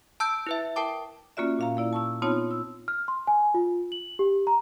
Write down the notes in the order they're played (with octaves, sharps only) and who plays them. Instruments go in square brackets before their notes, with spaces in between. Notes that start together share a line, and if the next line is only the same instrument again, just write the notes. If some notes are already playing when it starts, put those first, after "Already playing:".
[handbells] A5 E6 G6 D7
E4 B4 E5
A#4 G5 A5 D6
[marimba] A#3 C#4 F4 F#4 D5 E5
A#2 F5 A#5
A#3 E4 D5
A5 C#6 E6
B3 C4 D#4 F4 C#5 A5
E6
[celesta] F6
C6
G#5
F4
F#7
G4
A#5